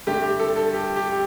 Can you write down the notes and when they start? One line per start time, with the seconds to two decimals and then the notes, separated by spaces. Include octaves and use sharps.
0.07 G2 D3 A3 G4
0.23 G4
0.40 A4
0.56 A4
0.73 G4
0.96 G4